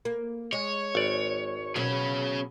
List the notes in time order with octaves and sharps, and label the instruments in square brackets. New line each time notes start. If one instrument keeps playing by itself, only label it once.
[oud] A#3
[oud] G#3 [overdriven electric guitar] C#5
[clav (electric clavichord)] G#1 D5
[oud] B2 F#3 F#4 [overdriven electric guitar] C#4 G#4